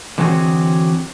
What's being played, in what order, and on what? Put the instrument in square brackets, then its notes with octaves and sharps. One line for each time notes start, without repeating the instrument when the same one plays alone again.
[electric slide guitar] D3 E3 F#3 C4 F#4 G#4